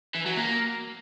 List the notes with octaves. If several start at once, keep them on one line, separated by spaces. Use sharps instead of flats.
E3
F#3
A#3